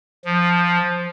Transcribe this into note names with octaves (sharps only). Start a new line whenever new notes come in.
F3